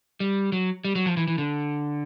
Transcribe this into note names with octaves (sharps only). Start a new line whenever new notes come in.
G3
F#3
G3
F#3
F3
E3
E3
D3